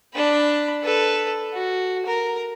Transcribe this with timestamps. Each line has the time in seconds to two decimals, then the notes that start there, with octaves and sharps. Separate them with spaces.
0.14 D4 B5
0.83 A4 B4
1.53 F#4
2.06 A#4